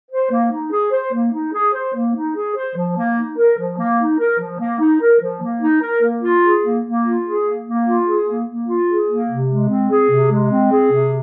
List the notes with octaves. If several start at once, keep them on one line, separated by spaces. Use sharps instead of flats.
C5
A#3
D#4
G#4
C5
A#3
D#4
G#4
C5
A#3
D#4
G#4
C5
F3
A#3
D#4
A#4
F3
A#3
D#4
A#4
F3
A#3
D#4
A#4
F3
A#3
D#4
A#4
A#3
F4
G#4
A#3
A#3
F4
G#4
A#3
A#3
F4
G#4
A#3
A#3
F4
G#4
A#3
C3
G#3
C4
G#4
C3
G#3
C4
G#4
C3